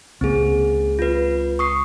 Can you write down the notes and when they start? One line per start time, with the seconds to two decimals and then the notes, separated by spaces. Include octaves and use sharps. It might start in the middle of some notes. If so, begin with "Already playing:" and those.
0.21 C#2 C#3 A#3 C4 G#4
0.99 F4 B4
1.59 C#6 D#6 C7